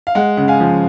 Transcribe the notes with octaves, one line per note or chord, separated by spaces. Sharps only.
F5
G#3 F#5
C#3 F#5
F5 G#5
F3